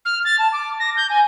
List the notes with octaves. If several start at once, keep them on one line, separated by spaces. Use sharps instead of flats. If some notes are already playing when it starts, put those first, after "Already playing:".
F6
A6
A5
D6
A#6
G6
G#5